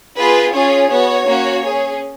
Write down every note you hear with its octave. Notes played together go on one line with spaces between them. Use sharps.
B3 F4 G#4 B4
C#4 F4 G#4 C#5
B3 F#4 C#5
A#3 C#4 F#4
C#4 G#4